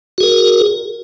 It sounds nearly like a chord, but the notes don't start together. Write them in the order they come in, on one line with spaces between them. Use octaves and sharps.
F#4 G#4 A#4